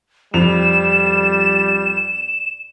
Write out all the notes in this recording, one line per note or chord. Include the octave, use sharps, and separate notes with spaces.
F2 G3 E7 F7